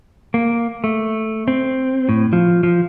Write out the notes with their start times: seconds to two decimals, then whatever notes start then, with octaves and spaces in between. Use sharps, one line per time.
0.34 A#3
0.84 A3
1.48 C4
2.09 A2
2.33 F3
2.63 F3